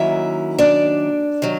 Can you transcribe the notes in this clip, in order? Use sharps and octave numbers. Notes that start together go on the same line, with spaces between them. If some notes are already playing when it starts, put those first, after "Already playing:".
Already playing: D#3 F#3 A#3 C#4 E4 E5
D4 D5
D#3 F#3